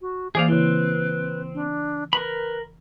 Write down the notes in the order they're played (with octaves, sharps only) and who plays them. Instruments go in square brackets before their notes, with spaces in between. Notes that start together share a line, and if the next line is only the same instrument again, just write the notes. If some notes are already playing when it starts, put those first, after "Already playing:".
[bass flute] F#4
[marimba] E3 A#3 [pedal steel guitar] G#4 D5 F5 [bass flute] C5
[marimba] C#3 E4 [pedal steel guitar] C4 [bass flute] B4
[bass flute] D4
[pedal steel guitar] A#4 B5 [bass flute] B4